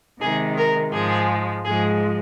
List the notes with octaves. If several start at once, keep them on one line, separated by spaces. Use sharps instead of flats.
C3 D#3 G#3 G#4
A#4
G#2 F3 G#3 G#4
G#2 F3 G#3 G#4